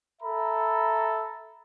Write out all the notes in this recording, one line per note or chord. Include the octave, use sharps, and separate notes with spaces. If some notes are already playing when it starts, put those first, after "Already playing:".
A4 E5 A#5 B5